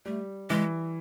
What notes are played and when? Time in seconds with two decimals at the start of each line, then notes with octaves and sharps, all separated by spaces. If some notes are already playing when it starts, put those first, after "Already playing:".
0.05 G3 A3
0.50 E3 G#3